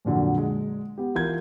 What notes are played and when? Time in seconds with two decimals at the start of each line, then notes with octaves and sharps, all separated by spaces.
0.05 F2 A#2 D3 F#3
0.38 G#3
0.98 B3 G4
1.15 E3 F4 A#4 G6 G#6